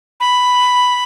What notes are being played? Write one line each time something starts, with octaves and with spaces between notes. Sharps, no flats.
B5